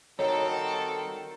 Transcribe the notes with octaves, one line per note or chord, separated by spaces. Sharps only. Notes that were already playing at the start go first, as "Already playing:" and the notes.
D#3 G3 C4 D#4 F#4 A4 C#5